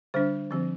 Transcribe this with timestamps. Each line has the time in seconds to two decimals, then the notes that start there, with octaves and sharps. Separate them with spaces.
0.14 D3 G3 D4 C5
0.51 D3 F3 C4